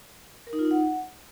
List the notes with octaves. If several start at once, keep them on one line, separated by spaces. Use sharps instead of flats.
A#4
D#4
F4
D#4
F#5